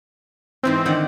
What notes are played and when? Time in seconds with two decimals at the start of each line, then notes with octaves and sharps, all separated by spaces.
0.63 G#2 E3 C4 C5
0.85 D3 D#3 F#5